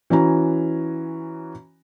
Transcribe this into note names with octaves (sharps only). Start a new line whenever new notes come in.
E3 C#4 F#4 A#5